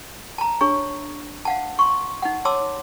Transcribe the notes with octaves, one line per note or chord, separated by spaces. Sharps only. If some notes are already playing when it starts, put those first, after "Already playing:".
A5 A#5
D4 G#4 C#5 C#6
F5 F#5 A5
C6 C#6
D#4 F#5
C#5 A5 C6 D6 E6